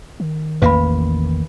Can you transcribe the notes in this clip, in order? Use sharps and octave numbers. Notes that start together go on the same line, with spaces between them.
D#3
A1 E2 A#3 B4 F5 B5